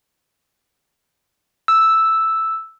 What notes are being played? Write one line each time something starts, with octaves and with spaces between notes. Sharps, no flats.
E6